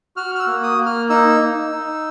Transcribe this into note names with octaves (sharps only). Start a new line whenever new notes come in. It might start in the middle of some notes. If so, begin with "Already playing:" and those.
F#4 F6
F6
E6
A#3
D#6
A#3
F6
D#4 E6
D#4
D#4